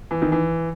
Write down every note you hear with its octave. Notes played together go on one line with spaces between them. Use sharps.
E3
D#3
E3